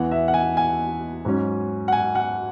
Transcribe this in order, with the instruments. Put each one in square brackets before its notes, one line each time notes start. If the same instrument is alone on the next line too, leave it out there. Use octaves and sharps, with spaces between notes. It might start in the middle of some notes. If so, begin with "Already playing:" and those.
Already playing: [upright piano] E2 E3 B3 F#5
E5
F#5
G#5
G#5
G#2 F#3 C#4
F#5
G#5
F#5